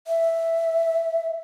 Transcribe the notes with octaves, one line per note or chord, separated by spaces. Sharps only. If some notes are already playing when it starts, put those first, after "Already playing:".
E5